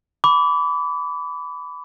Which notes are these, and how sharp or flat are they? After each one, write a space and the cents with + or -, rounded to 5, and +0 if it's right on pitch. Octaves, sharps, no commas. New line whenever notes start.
B5 +15 D6 -30